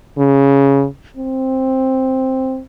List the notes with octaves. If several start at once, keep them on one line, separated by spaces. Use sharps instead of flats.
C#3
C4